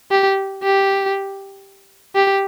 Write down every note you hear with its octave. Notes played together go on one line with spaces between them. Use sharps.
G4
G4
G4